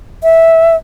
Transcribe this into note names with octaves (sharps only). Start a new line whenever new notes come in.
E5